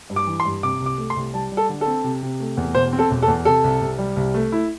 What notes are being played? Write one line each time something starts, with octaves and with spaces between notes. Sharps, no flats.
G2
D6
E3
C6
G2
C3 D6
C2
D6
A3
C6
C2
G3 A5
G3
A4
D3
A4
C4
C3
C3
A3
E2
E1 C5
C4
A4
E1
A4
E2
C3 A4
C2
C2
G3
C2
A3
E4